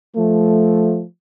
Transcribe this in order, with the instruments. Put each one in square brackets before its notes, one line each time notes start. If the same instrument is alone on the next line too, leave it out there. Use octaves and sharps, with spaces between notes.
[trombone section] F3 A3